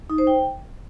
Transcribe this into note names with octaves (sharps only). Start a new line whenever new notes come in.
D#4
C5
G5